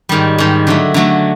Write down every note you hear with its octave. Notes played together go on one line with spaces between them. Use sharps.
G#2 D#3 G3
G#2 D#3 G3
D3 F#3 A3
D3 F#3 A3